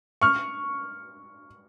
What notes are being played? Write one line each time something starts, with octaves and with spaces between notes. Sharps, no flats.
C#6 F6